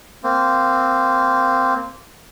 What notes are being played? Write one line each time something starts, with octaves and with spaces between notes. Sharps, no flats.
A#3 C4